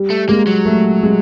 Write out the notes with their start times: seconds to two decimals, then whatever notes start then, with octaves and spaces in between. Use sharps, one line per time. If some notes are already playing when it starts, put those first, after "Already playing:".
Already playing: G3
0.10 A3
0.29 G#3 A#3
0.47 F#3
0.65 A3
1.03 G#3